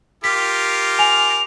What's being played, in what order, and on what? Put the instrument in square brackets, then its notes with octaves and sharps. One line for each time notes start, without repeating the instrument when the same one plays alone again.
[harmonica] F4 G4 A#4 [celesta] B6
[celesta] G#5 [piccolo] F7